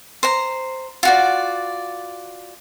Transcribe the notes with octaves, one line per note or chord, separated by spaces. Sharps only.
C5 A#5
F4 F#4 D5